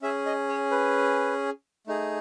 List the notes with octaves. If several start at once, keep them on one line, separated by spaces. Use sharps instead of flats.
C#4 G#4 E5
D#5
C#5
B4
A3 D#4 G#4